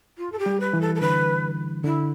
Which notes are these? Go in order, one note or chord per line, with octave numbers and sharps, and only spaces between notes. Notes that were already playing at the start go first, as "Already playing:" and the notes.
F4
A4
G4
G3
B4
E3
A4
A4
D3 B4
D3 E4